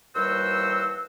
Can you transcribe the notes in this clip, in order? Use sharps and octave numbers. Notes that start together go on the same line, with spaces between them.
D#2 E3 G3 F#4 C5 E6